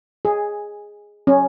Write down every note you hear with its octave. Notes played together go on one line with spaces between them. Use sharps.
G#4
C#4